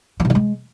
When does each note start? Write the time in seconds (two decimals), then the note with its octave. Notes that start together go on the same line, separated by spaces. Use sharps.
0.20 E3
0.25 C3
0.30 E3
0.35 G#3